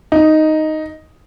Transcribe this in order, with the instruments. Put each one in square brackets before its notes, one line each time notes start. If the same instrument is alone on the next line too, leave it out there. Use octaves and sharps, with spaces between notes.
[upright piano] D#4